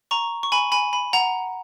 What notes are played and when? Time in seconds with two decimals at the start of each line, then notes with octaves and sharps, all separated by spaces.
0.11 A#5 C#6
0.43 C#6
0.52 G#5 B5
0.72 G#5 B5
0.93 G#5 B5
1.13 F#5 A#5